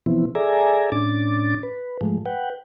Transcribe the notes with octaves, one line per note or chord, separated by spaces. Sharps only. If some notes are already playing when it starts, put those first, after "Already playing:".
B2 E3 F3 B3 C4 E4
G#4 A4 D5 E5 G#5 A#5
A2 C#4 D4 D6 A6
B4
G#2 F3 G#3 A3
B4 F#5 G5